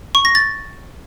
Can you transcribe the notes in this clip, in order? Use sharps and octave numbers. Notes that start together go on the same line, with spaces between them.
C#6
A#6
A6